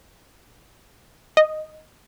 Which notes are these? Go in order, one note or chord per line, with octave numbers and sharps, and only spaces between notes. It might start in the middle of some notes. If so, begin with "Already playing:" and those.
D#5